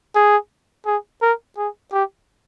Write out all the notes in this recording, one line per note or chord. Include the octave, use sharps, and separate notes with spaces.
G#4
G#4
A#4
G#4
G4